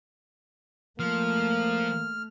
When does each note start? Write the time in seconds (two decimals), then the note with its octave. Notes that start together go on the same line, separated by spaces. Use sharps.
1.00 F3 A3 A#3 F6